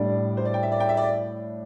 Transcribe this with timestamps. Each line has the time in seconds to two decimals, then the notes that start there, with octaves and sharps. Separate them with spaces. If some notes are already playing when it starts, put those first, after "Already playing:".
Already playing: A2 G3 D4 D5
0.37 C5
0.45 D5
0.54 G5
0.63 E5
0.72 D5
0.80 G5
0.89 E5
0.97 D5